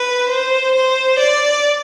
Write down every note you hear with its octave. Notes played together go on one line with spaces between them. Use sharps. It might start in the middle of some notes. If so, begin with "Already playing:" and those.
Already playing: B4
C5
C5
D5